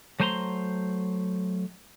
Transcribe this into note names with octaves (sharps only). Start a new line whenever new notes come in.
F#3 A3 C5 G#5 A#5 C6